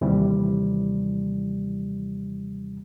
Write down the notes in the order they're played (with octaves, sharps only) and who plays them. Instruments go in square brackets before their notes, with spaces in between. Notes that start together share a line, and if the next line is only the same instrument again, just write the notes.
[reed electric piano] D#2 C3 E3 G3